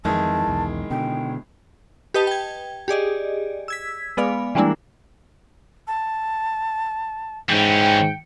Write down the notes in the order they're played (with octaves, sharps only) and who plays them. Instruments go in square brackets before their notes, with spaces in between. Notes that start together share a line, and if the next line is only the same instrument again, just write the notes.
[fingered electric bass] F2 E3 [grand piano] D#3 G#3 E4 [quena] A5
[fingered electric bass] B1 E2
[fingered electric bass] B2 D3 [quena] G5
[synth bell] G4 B4 D#5 G5 A5
G5 G#6
G4 G#4 D5 D#5
E6 G#6 B6
G#3 B3 D5 F5
E3 G3 G#3 A#3 D4 E4
[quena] A5
[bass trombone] G#2 [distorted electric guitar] E3 C#4 [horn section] G5